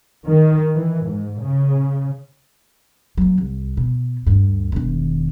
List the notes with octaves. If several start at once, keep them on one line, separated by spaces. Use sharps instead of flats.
D#3
E3
G#2
C#3
F#3 A#3
C2
B2
D2 G2
E1 D#3